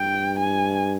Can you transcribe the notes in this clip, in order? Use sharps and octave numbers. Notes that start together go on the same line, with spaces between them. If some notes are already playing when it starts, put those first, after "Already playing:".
Already playing: G2 G5
G#5